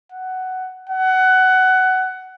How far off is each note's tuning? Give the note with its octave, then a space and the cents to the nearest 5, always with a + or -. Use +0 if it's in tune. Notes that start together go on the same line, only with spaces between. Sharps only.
F#5 +10
F#5 +15